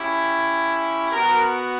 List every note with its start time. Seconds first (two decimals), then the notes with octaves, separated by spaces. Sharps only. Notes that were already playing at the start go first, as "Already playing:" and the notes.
Already playing: C#4 E4 G4
1.12 B3 F#4 A#4